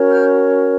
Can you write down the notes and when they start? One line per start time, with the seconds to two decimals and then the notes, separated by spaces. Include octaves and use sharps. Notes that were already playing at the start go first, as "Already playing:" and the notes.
Already playing: C#4 F#4 A#4 C#5
0.10 F6 G6